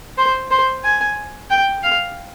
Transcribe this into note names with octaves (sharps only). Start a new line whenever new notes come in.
C5
C5
G#5
G5
F5